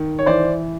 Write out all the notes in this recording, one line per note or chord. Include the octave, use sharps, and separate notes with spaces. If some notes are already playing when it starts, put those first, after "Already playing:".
Already playing: D#3
C#5
E3 C5 D5